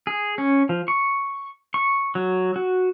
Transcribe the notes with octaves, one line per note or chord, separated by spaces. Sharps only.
G#4
C#4
F3
C#6
C#6
F#3
F#4